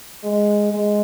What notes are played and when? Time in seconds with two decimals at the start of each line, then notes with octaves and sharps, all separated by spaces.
0.24 G#3
0.72 G#3